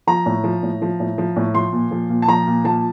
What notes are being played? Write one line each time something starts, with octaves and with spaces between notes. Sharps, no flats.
F3 A#5
A2
F3
A2
F3
A2
F3
A2
F3 C6
A#2
F3
A#2
A5
F3 A#5
A#2
F3 A5